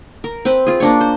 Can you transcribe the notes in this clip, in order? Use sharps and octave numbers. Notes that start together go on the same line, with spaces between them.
A#4
C4 B4
F4 G#4
A#3 D4 C#5
C5